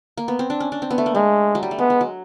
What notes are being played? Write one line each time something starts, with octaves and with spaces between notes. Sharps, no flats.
A#3
B3
C4
D4
C#4
D4
C4
B3
A3
A#3
G#3 A3
F#3
G3
A3
G#3 B3
G#3
F#3